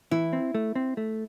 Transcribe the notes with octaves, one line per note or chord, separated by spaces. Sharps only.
E3 E4
C4
A3
C4
A3